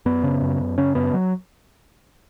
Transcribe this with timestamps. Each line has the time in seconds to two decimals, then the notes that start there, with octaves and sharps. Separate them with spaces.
0.06 F#2 B3
0.23 C#3
0.42 F#2
0.60 F#2
0.78 C#3 C#4
0.95 F#2 B3
1.14 F#3